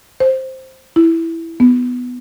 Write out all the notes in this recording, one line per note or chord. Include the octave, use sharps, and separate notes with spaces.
C5
E4
B3